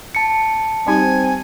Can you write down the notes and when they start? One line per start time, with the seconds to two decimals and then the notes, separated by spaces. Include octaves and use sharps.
0.15 A5 C#7
0.87 G3 C4 D#4 G4 G#5